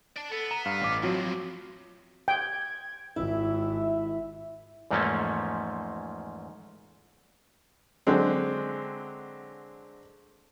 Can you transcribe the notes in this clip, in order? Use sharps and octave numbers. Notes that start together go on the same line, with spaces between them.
D5 A5
B3 A4
A#5 E7
G2 F5
A1 D6
E2 G2 F3 F#3 C4 F#4
G5 G#6
G#1 E4 E5
E2 G#2 F3 A3 A#3 C#4
D3 F#3 G#3 C4